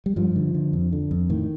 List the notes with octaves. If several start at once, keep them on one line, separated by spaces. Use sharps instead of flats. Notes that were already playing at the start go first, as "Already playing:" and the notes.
G3
G2 F3
D3
D3
F2
D3
F2
A2 D#3